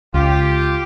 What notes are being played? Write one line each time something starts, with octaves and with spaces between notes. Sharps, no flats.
C#2 F4 G4